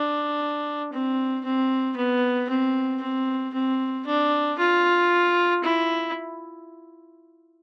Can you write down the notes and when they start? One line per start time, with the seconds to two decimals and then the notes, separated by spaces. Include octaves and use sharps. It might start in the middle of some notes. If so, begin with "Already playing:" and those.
Already playing: D4
0.93 C4
1.45 C4
1.96 B3
2.49 C4
3.02 C4
3.54 C4
4.07 D4
4.59 F4
5.64 E4